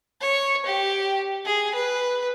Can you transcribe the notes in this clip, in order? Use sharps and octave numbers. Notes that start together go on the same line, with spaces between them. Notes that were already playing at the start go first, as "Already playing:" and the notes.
C#5
G4
G#4
B4